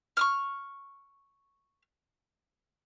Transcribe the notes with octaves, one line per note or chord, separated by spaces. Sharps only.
C#6 D#6 F6